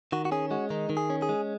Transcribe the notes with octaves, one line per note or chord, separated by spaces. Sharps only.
D#3 F#4
F#4
C#4 G#4
G#3 F#4
D#3 D#4
D#3
G#4
C#4
G#4
G#3